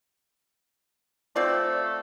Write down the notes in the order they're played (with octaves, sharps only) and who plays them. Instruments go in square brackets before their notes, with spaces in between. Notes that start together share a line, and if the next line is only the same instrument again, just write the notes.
[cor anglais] A3 [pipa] C4 F4 D5